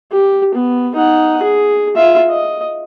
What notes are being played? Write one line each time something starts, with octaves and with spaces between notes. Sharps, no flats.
G4
B3
D#4 F#5
G#4
F4 E5
D#5